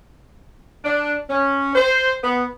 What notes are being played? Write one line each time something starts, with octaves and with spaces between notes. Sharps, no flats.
D4
C#4
C5
B3